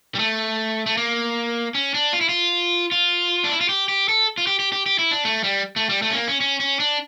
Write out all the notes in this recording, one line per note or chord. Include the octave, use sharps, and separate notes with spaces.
G3
A3
A3
A#3
C#4
D4
F4
E4
F4
F4
D4
E4
F4
G4
G4
A4
F4
G4
G4
G4
G4
E4
D4
A3
G3
A3
G3
A3
C#4
A#3
C#4
C#4
C#4
D4